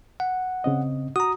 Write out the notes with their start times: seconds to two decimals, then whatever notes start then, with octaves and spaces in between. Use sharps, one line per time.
0.20 F#5
0.64 C#3 C4 D#5
1.16 F#4 A#5 D#6